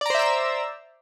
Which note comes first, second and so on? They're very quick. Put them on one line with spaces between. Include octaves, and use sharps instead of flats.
D5 A#5 C5 E5 E6